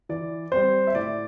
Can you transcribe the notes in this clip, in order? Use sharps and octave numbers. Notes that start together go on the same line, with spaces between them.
E3 D5
G3 C4 C5
E5
A2 D5